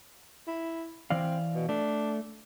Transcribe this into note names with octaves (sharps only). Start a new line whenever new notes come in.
E4
E3 C4 D5 F5
B2
A3 D4